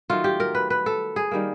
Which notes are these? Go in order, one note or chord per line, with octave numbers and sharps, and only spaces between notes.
D#3 F#3 A3 F4
G4
A#4
B4
B4
A4
G#4
D#3 G3 A#3